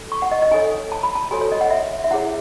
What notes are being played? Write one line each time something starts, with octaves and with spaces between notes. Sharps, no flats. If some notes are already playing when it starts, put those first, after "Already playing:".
Already playing: A4
C#6
F#5
D#5
D#5
D#4 A4 C#5 G#5
A5
B5
A5
F#4 A4 C#5 G#5
C#5
D#5
F#5
E5
E5
E4 G#4 C#5 F#5